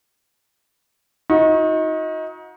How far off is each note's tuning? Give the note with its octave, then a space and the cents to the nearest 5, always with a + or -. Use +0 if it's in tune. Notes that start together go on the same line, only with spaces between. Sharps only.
D#4 +25 F#4 -35